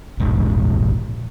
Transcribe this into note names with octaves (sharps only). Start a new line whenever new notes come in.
E1 A#1 G#2